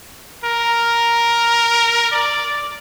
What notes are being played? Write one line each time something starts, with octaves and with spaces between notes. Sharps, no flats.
A#4
D5